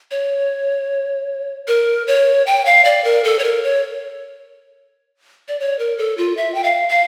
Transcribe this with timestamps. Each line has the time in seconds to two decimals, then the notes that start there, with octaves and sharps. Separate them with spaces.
0.11 C#5
1.68 A#4
2.07 C#5
2.47 G5
2.66 F5
2.85 D5
3.04 A#4
3.24 A4
3.39 C#5
3.44 A#4
3.64 C#5
5.48 D5
5.60 C#5
5.79 A#4
5.98 A4
6.18 F4
6.37 E5
6.54 G5
6.64 F5
6.89 F5